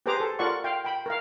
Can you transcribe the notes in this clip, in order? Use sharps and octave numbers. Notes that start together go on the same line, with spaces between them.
G4 G#4 B4 C5 A#5 D6
A4
F4 A4 A#4 D5 F#5 C#6
F5 G5
G5 B5
A#4 F5